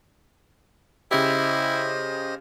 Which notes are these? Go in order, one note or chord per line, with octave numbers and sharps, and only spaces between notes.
C#3 E4 G4 C5 D#5